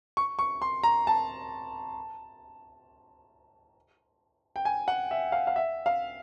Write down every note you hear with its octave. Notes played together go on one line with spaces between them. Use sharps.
C#6
C#6
C6
A#5
A5
G5
G#5
F#5
E5
F5
F5
E5
F5